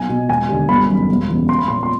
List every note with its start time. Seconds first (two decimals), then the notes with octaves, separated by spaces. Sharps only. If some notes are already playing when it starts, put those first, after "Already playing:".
Already playing: B1 G#5
0.09 B2
0.29 E1 G#5
0.48 D#2 D3
0.69 G1 B5
0.89 F#2 D#3
1.09 E1
1.29 E2 C#3 E3
1.48 A#1 C6
1.58 B5
1.68 A#2 C6
1.83 C6